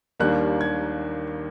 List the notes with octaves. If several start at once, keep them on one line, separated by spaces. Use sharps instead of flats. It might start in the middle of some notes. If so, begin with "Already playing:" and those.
D#2 D#3 G3 A#3 D4 F#6
G#6